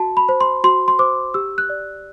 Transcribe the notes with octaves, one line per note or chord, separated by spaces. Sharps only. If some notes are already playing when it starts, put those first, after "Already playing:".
Already playing: F#4 A5
B5
C5
C6
F#4 C6
C6
C5 D6
G4 E6
F#6
D5